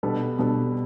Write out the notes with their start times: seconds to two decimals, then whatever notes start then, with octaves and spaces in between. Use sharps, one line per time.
0.03 B2 G3 B3 D4 A4
0.38 B2 G3 B3 D4 A4